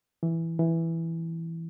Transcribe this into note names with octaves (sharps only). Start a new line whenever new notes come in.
E3
E3